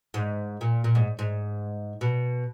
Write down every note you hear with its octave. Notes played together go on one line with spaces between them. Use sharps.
G#2
A#2
A#2
G#2
G#2
B2